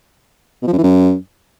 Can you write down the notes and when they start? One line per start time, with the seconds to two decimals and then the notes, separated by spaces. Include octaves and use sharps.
0.62 B2
0.68 F3
0.73 F#2
0.78 E3
0.83 F#2